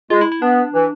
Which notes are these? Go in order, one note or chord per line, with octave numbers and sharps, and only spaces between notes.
G#3 F4
E4
E4
B3 D4
E3